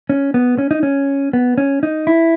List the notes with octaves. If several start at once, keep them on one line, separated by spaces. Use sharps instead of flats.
C#4
B3
C#4
D#4
C#4
B3
C#4
D#4
E4